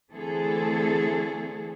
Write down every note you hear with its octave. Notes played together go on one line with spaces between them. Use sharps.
D3 E3 A3 C4 G#4 A4